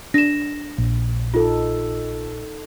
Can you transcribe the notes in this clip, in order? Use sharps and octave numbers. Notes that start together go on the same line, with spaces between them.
D4 A#6 E7
A#1
D#4 F4 A4